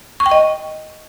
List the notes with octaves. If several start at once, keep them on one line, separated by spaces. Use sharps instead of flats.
C#6
G5
D#5